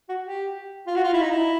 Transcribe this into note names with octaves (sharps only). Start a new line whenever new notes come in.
F#4
G4
F4
F#4
F4
E4
D#4
E4